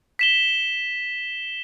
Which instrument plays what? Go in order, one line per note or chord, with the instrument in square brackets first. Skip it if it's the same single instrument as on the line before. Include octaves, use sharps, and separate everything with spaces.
[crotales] B6 E7 G7